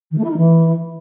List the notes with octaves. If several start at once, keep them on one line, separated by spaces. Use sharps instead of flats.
D#3
A3
E4
D#4
E3